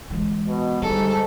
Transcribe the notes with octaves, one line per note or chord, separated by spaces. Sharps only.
E3 G#3
B2
G#2 D3 G3 A4